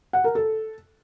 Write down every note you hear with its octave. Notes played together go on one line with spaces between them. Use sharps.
F#5
A#4
A4